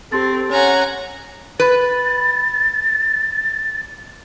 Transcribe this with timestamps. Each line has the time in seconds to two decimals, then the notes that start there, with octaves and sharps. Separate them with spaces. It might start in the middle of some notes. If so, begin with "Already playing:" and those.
0.12 C4 G4 A4 C6 A6
0.50 C#4 F#5 G#5 A#5
1.60 B4 A6